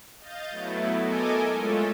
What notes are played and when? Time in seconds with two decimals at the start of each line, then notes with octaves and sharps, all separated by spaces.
0.18 D#5 F5 G6 A6
0.50 F#3 A3 B3 E4
0.98 A4 A#4 D#5 G#5 D6
1.50 G#3 A3 C#4 F4 A4